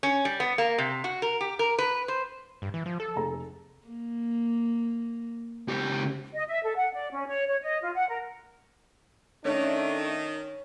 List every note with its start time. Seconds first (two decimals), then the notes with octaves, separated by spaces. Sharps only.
0.03 C#4
0.25 G3
0.40 B3
0.58 A#3
0.78 C3
1.04 F#4
1.22 A#4
1.41 G4
1.59 A#4
1.78 B4
2.08 C5
2.62 G2
2.74 E3
2.86 F3
3.00 A4
3.16 F1 G#4 A#5
3.87 A#3
5.68 C#2 G4
6.34 D#5
6.48 E5
6.64 A4
6.76 F#5
6.93 D5
7.11 C#4
7.27 C#5
7.47 C#5
7.62 D#5
7.82 F4
7.94 F#5
8.08 A#4
9.45 D#3 A3 C#4 D4